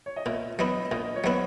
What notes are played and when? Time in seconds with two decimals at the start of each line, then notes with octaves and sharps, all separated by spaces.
0.06 C#5
0.16 D#5
0.26 A#2 E5
0.59 F#3 B3 E4 D#5
0.91 A#2 D#5
1.16 C#5
1.24 F#3 B3 E4 D#5